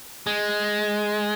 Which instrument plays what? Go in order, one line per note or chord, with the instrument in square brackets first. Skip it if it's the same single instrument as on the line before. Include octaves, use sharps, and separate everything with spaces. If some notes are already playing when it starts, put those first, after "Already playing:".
[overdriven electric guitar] G#3